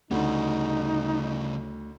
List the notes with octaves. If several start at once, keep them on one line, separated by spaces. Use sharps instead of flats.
D2 C#3 G3 D#4